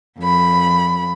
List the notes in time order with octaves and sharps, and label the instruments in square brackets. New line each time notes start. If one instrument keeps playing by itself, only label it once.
[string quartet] F2 B5